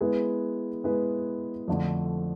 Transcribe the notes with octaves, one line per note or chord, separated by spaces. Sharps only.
G#3 B3 E4 G#4 B4
G#3 B3 E4 G#4 B4
F2 D3 F3 A3 D4